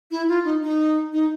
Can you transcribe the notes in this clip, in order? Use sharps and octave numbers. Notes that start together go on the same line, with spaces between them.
E4
F4
D#4
D#4
D#4